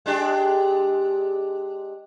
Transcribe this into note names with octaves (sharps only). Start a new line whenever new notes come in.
G#3 D4 G4